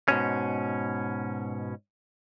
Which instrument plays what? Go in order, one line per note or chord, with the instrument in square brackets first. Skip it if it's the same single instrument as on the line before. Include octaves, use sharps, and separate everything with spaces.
[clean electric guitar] G#2 B2 C#4